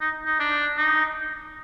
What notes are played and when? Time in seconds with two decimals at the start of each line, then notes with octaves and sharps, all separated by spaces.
0.01 D#4
0.26 D#4
0.40 D4
0.77 D#4